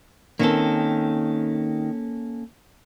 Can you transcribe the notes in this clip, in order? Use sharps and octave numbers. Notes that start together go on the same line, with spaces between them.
D#3 A#3 C4 C#4 A4